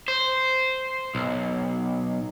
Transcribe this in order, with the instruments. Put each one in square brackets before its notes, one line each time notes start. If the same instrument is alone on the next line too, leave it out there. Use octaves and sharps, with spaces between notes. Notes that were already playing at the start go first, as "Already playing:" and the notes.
[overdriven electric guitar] C5
B1